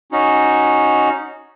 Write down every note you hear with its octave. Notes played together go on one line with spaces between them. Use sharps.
C#4 D#4 F#4